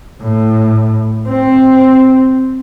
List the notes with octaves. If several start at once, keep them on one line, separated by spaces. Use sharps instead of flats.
A2
C4